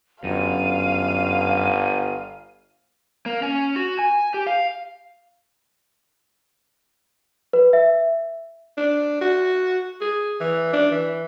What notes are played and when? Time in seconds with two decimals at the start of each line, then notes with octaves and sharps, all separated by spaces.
0.24 G1 F#2 F5 D#7
3.26 A#3
3.42 C#4
3.76 F#4
3.99 G#5
4.34 G4
4.47 F5
7.53 B4
7.73 E5
8.77 D4
9.21 F#4
10.01 G#4
10.40 E3
10.73 D4
10.91 E3